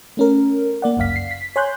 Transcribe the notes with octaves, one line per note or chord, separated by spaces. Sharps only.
A3 C#4 A#4
A#3 D5 F#5
G1 C#2 F#2 F5 B6
C7
B6
C#5 G#5 C6 F#6 G6